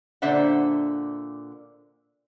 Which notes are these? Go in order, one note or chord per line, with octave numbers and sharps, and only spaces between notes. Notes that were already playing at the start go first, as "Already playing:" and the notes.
A#2 D3 D4 C5 E5 F#5